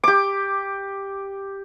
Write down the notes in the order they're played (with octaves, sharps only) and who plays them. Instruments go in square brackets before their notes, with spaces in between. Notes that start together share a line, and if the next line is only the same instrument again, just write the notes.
[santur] G4 D6